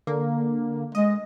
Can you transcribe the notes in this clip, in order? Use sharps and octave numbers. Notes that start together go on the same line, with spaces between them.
D3 A#3
G#3 D#5